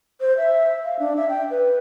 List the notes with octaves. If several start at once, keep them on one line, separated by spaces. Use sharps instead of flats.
C5
E5
F5
D4
E5
G5
B4